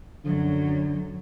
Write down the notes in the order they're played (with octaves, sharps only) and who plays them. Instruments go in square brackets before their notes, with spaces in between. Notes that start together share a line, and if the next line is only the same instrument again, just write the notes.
[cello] F#2 F#3 [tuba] D3